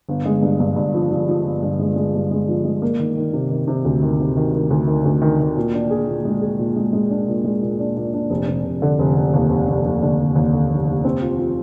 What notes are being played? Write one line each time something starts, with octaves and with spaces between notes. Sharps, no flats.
G1
G#3
G2
G2
G2
F3
F3
F3
G1
G2
G#3
G#3
G2
G#3
F3
G#3
A#3
D#3
D#3
C3
D#3
C3
D2
D#3
C3
D#3
D#3
D2
D#3
D2
D#3
D#3
A#2
D4
G#4
A#2
G#3
G#4
A#2
G#3
G#3
D4
A#2
G#3
A#2
D4
A#2
D4
F1
F1
F1
D3
F1
F1
D#2
F1
F1
F1
D3
F1
D#2
D3
F1
F1
C4
F4
F4